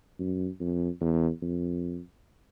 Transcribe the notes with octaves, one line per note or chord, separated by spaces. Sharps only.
F#2
F2
E2
F2